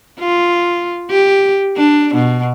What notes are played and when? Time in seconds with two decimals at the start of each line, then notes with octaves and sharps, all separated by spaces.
0.20 F4
1.10 G4
1.77 D4
2.14 B2